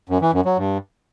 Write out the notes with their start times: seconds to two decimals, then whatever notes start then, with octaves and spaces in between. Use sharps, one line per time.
0.09 F#2
0.21 E3
0.33 F#2
0.45 F#3
0.57 G2